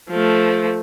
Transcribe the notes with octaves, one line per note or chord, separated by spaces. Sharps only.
F3 A3